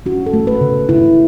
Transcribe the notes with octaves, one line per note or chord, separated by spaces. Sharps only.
C#4 F#4
A4
A3
B4
C#3
C#3 E4